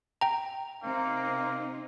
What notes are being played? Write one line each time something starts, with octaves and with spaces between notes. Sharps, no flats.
G5 A#5
C3 A#3 C4 D#4